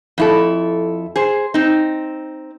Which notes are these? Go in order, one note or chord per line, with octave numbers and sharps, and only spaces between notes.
F2 E4 A4
G#4 C5
C4 D#4